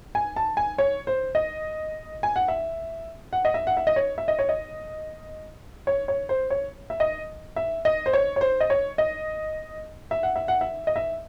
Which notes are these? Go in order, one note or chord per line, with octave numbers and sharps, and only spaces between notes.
G#5
A5
G#5
C#5
C5
D#5
G#5
F#5
E5
F#5
D#5
E5
F#5
E5
D#5
C#5
E5
D#5
C#5
D#5
C#5
C#5
C5
C#5
E5
D#5
E5
D#5
C5
C#5
C#5
C5
D#5
C#5
D#5
E5
F#5
E5
F#5
E5
D#5
E5